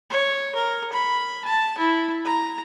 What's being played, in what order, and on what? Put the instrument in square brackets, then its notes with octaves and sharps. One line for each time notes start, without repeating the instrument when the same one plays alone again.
[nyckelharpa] C#5
A#4
B5
A5
E4
A#5